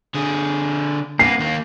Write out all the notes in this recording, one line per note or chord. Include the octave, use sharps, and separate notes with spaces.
D3 G#4
A#3 B3 C7
D#2 A#3